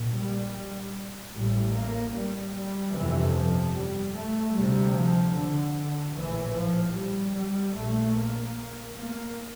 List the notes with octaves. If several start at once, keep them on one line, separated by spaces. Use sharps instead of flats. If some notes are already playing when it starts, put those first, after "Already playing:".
Already playing: A#1 A#2
G3
A1 A2 G3
A#3
G3
G3
G1 F2 C3 E3
F3
G3
A3
D2 C3 G3
F3
D3
A#1 A2 E3
F3
G3
G3
A#1 A#2 A3
A#3
A#3